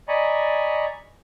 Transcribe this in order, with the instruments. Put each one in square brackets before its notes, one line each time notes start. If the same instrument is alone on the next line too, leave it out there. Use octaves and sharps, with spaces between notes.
[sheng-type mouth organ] D5 D#5 G#5 A#5 B5 C#6